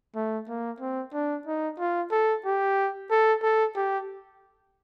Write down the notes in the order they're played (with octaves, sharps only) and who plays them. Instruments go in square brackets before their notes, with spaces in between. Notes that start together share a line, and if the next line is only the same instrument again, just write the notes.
[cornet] A3
A#3
C4
D4
D#4
F4
A4
G4
A4
A4
G4